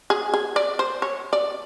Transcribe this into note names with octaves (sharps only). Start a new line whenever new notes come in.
G#4
G#4
D5
C5
C#5
D5